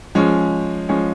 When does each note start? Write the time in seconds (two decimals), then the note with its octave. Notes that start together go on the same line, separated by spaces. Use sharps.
0.15 F3 G#3 C#4
0.89 F3 G#3 C#4